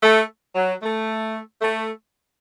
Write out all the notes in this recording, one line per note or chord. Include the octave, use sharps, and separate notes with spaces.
A3
F#3
A3
A3